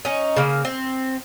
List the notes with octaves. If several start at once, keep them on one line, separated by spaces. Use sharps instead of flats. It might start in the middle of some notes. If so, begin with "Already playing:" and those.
C#4 D#4
C#3 A#3
C4